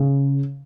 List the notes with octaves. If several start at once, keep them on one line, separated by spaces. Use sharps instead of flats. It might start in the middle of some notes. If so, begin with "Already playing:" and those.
Already playing: C#3